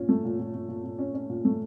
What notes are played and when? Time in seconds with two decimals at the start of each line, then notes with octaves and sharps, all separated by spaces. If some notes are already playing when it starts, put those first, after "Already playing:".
Already playing: A#2 C#4
0.09 A3
0.25 A#2
0.39 A#2
0.54 A#2
0.69 A#2
0.84 A#2
0.99 C#4
1.14 C#4
1.30 A#2
1.45 A3